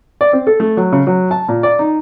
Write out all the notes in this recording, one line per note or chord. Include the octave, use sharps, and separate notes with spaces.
D5
C4
A4
A3
F#3
C#3
F#3
A5
A#2
D5
D#4